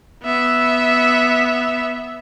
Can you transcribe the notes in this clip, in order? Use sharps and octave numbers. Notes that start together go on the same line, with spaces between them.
B3 E5